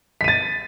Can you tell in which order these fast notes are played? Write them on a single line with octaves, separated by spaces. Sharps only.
B6 D#7 A6